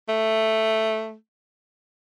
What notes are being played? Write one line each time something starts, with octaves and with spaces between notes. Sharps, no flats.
A3